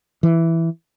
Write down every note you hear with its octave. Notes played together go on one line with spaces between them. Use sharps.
E3